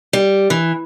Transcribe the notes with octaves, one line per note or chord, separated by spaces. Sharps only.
G3
E3